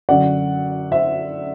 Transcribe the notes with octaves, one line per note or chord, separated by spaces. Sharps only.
F#2 D3 F#3 D5 F#5
C5 E5